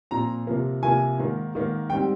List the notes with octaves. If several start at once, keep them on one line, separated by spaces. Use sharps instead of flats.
A#2 F3 C4 A#5
C3 F3 A#3
C3 F3 A#3 G#5
G#2 D#3 A#3
G#2 D#3 A#3
G#2 G3 C4 G5